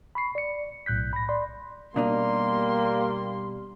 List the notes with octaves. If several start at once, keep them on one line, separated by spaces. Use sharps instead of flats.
B5 C#6 C7
D5 C#7
B1 A2 F#6 G6 B6
B5 A#6
D5 B5 C6
B2 G3 A#3 D4 D#4 C6